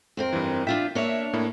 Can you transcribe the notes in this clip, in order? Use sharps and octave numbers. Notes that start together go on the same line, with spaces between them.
F2 C4 A#4
G2 E3
D4 F4 E5 G5 B6
A#3 D4 C#5 E5
A2 A#3 E4